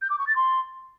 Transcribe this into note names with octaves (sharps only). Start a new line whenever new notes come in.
G6
D6
C#6
A6
C6